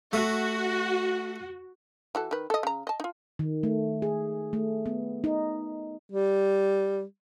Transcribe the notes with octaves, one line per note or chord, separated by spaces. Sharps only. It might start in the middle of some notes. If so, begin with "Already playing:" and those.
A3 F#4
E3 F#4 A4
D#3 B4
A4 D#5
C#3 A#5
D#5 A5
D#4 F4
D#3
A3
G#4
A3
B3
D#4
G3